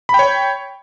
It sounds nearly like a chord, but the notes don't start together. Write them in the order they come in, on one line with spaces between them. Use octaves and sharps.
B5 G5 C#5